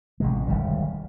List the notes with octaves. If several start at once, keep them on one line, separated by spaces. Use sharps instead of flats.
A1 C3 G#3
D1 D2 D#3 G3